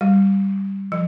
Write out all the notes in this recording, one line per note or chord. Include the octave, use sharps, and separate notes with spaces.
G3
F3